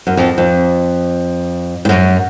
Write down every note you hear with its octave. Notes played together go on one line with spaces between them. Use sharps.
F#2
F2
F2
G2
F#2